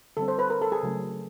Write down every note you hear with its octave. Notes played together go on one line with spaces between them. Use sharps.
D3 G3 C4 A4
C5
B4
A#4
A4
G#4
C#3 F#3 A3 C#4